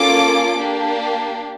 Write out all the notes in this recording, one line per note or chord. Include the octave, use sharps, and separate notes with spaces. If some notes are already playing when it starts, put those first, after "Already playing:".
Already playing: A#3 C#4 F4 A4 D6
A#3 D4 G4